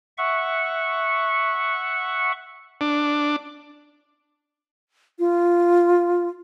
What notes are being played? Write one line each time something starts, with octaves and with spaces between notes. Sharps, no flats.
E5 F#5 C#6
D4
F4